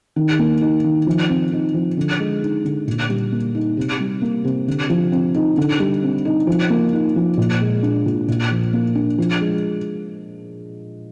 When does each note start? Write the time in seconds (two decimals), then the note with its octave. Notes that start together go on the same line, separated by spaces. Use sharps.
0.16 D#3
0.39 A#3
0.61 D#4
0.84 D#3
1.07 F3
1.29 C4
1.52 D#4
1.74 F3
1.97 D3
2.19 G#3
2.42 D#4
2.65 D3
2.87 A#2
3.09 G3
3.32 A#3
3.55 D#4
3.77 C3
4.00 G3
4.22 A#3
4.44 C3
4.67 D3
4.90 F3
5.12 C4
5.35 D#4
5.57 D3
5.80 G3
6.03 C4
6.25 D#4
6.47 F3
6.70 A#3
6.93 D#4
7.16 F3
7.37 A#2
7.61 G#3
7.83 D4
8.06 A#2
8.28 A#2
8.51 F3
8.73 A#3
8.95 D4
9.18 F3
9.41 G#3